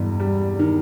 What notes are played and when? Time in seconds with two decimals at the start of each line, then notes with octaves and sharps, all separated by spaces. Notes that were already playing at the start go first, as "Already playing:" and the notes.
Already playing: E1 E2 G2
0.20 G3
0.59 D#3